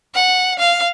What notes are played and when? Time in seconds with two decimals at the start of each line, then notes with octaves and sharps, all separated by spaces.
0.15 F#5
0.59 F5